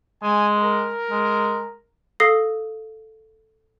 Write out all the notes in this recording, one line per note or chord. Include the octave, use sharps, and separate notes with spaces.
G#3 G#5
A#4
G#3
A4 F5 D#6 A#6 C7